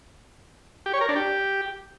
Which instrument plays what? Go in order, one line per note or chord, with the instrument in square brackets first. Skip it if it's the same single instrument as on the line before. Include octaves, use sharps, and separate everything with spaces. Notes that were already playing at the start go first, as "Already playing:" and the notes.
[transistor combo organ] G4
C#5
A#4
D4
G4